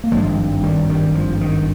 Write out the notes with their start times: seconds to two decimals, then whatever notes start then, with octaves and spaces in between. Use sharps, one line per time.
0.04 A#3
0.12 G#1 G2 F3 G#3
0.63 D#3 G3
0.90 D#3 G3
1.15 F3
1.41 D#3